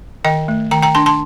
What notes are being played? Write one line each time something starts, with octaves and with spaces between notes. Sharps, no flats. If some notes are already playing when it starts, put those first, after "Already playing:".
D#3 D#5 G5
A3
D#3 G5 A#5
G5 A#5
D4 A5 C6
A5 C6